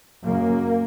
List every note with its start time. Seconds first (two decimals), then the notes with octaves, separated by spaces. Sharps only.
0.24 F#2 C#3 A#3